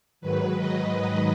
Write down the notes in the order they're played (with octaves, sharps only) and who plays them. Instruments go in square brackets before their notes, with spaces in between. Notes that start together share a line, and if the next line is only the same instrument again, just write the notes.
[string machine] G#2 D#3 F#3 B4
D#5